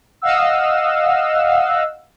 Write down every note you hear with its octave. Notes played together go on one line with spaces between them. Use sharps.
D#5 F5 F#5 E6